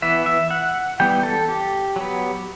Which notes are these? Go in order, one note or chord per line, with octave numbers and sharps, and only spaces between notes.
E3 B3 E5
E5
F#5
E3 G3 B3 G5
A4
G4
F#3 B3